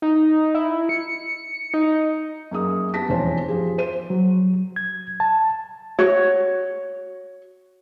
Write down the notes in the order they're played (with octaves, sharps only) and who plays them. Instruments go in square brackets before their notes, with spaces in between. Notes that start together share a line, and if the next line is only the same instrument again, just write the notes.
[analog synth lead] D#4
E4
C#7
D#4
[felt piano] F#2 A#3 G#4 D#6
B3 G4 A5 A#6 B6
E1 A1 F2 C#4 C5 A5
F3 G4 G#4
C5 D#7
[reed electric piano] F#3
G#6
A5
[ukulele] F#4 C#5